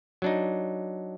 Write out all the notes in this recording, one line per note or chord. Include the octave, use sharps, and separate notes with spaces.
F#3 D4 D#4